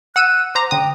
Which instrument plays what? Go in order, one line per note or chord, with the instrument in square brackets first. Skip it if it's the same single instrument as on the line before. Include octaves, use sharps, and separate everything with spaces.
[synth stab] F#5 E6 D#7 [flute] F#6
[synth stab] C5 A#5 [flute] D6
[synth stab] D3 D#6 [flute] G5